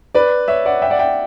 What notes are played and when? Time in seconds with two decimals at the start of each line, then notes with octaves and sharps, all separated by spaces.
0.15 B4 D5
0.48 C#5 E5
0.66 D5 F#5
0.82 E5 G5
0.90 D5 F#5
0.99 E5 G5